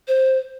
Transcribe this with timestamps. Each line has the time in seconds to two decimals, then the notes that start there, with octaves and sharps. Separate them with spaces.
0.08 C5